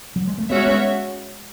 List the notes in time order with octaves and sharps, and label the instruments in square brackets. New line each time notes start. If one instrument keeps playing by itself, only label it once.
[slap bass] F#3
G#3
A3
[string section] G#3 C#4 F#4 C#5 E5 [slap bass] B3
[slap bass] B3